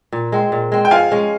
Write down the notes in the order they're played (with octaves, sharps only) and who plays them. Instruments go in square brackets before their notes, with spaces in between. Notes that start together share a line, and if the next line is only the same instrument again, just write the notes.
[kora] A#2
G#3 C4
A#2
G#3 C4
[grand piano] G5
[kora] F3 [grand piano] F5 G#5
[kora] G#3 C#4